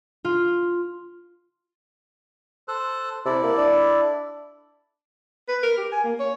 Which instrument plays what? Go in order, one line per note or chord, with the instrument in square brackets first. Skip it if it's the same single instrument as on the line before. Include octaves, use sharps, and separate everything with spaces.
[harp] F4
[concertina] A4 C5 F#6
[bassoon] C3 [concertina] E4 A4 D5
[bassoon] A#3
D4
[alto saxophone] B4
A#4
G4
G#5
A#3
C#5